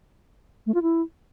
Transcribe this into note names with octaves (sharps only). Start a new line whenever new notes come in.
A3
F4
E4